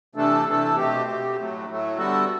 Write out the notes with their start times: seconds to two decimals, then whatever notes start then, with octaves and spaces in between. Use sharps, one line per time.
0.15 C3 E3 A3 D4 A4
0.46 C3 E3 A3 D4 A4
0.75 B2 A3 C4 G4
1.06 B2 A3 C4 G4
1.36 A2 F#3 A3
1.67 A2 F#3 A3
1.97 D3 G3 B3 F#4 A4